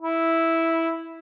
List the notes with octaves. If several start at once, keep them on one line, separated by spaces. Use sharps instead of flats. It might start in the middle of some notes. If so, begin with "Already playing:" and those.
E4